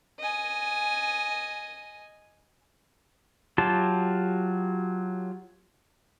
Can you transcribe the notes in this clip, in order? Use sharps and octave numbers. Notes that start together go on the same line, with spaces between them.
D#5 G#5
F#3 F4 G4 A5